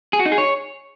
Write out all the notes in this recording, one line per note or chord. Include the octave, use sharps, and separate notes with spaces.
G#4
F#4
D#4
G#4
C#5